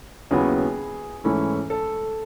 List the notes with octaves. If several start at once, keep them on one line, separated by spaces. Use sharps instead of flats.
D#2 C#3 F#3 B3 E4 G#4
G#2 E3 A3 C#4 E4
A4